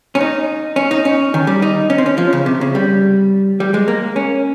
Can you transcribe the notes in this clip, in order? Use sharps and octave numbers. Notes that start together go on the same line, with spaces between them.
C#4
D#4
C#4
D#4
C#4
D#3
G3
D#4
C#4
C4
C#4
F3
C#3
C3
C#3
G3
G3
G#3
A#3
C#4